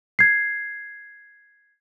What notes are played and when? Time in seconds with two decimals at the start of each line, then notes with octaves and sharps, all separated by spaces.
0.19 G#6 C7